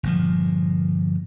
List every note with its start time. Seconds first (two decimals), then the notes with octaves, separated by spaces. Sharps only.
0.03 G1 A#2 F3